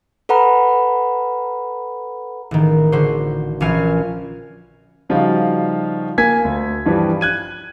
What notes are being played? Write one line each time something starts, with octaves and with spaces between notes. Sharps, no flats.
A4 B4 F#5 A#5 B5
A1 D#3
D3 F#4 C5
A#1 E3 C#4 F5 G#5 F6
C#3 F3 G3 D#4 F4 F#4
A#3 G#5 G#6 B6
D2
G2 E3 F3 G3
F#6 G#6 D#7